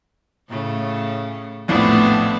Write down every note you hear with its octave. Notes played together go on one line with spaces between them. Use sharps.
A2 C#3 A3
A#1 F2 A2 A3 B3 D4